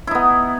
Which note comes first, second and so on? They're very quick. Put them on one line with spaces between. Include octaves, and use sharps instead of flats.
E4 D#4 B3